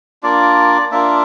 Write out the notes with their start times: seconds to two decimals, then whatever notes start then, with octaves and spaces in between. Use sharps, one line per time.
0.23 A#3 D4 F4 D5
0.92 A#3 D4 F4 E5